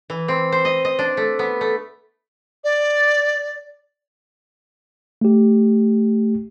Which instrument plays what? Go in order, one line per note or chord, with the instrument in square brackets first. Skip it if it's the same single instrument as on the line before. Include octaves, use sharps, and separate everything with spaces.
[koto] E3
C4
C5
D#5
D#5
D4
A3
B3
A3
[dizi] D5
[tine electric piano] A3 G4